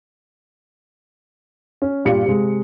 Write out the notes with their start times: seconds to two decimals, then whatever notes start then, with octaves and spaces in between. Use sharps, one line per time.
1.82 C#4
2.05 G2 A#2 F4 G4 C#7
2.26 C3 G#3